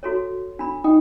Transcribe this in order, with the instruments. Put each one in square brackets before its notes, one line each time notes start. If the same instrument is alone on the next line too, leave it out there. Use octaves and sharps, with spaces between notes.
[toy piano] F#4 A4 C#5
D4 B5
[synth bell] D#4 [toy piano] G5